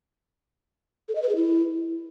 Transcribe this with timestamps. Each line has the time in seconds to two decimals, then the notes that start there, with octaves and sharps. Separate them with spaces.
1.08 A4
1.15 D#5
1.22 B4
1.29 G#4
1.36 E4